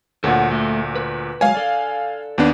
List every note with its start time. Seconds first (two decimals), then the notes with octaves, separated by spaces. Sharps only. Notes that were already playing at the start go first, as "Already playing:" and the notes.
0.24 D2 A#2 A4 C#5 F#5
0.51 A3
0.95 B4
1.41 F#3 G#3 C#5 F5 G#5
1.55 A4 D5
2.38 D#2 B3 D4